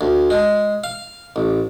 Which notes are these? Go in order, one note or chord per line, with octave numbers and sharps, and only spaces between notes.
D2
G#3
F5
A1